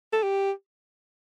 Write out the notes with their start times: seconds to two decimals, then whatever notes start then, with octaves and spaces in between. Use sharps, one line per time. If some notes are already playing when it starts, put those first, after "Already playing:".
0.13 A4
0.23 G4